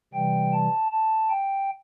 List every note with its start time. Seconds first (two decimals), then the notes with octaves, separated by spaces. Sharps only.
0.14 C3 E3 G3 G5
0.53 A5
0.91 A5
1.30 G5